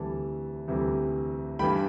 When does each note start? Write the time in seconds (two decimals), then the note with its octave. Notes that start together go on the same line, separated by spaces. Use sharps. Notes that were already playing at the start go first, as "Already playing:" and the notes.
Already playing: D2 C3 E3 G3 A5
0.68 D2 C3 E3 G3
1.59 G2 E3 G3 G5 B5